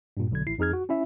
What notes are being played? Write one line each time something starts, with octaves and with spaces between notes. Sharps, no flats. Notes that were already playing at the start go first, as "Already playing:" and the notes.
G2 A#2
B1 D3 G#6
A1 E4 C7
F2 D#4 G#4 F6 G#6
F#4
C#4 E4 E5